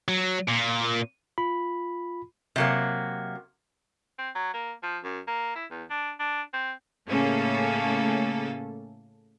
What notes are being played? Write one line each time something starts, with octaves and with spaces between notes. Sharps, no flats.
F#3
A#2
F4 B5
C3 F#3 A#3
C4
F#3
A#3
F3
F#2
A#3
E4
E2
D4
D4
C4
A2 C#3 A3 A#3 C#4 A4